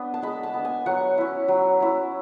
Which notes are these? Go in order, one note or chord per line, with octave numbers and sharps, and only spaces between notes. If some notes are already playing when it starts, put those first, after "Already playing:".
Already playing: B3 D4
A5
G#3 B5
A5
B3 D4
G#5
F#3 F#5
C#4 E4
F#3
C#4 E4